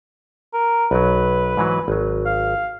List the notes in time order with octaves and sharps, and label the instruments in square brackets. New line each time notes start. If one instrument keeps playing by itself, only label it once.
[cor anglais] A#4
[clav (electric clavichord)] B1 F#3 [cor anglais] B4
[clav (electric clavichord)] G#2 E3 F#3
G#1 F#3
[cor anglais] F5